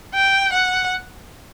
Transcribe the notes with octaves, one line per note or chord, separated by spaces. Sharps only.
G5
F#5